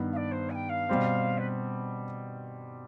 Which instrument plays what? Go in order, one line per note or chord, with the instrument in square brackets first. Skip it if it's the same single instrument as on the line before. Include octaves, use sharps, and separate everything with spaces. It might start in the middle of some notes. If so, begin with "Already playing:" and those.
Already playing: [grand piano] G2 D#3 B3
[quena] F5
D5
C5
G#5
G5
F5
[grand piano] B2 G3 C4
[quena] B4